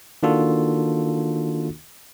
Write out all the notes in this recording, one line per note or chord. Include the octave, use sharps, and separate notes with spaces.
D#3 A#3 D4 F4 F#4 A4